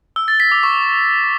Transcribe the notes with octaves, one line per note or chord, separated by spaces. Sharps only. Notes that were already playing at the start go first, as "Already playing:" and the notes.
E6
A6
B6
D6
C#6